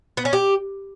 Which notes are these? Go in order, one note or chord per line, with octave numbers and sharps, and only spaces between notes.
B3
C#4
G4